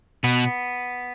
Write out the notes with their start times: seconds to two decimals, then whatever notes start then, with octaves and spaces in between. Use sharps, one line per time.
0.24 B2 B3